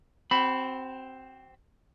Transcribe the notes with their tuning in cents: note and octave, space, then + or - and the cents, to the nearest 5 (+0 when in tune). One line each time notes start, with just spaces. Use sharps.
C4 +0 F#4 +35 B5 +5